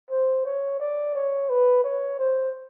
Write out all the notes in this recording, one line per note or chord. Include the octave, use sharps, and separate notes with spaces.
C5
C#5
D5
C#5
B4
C#5
C5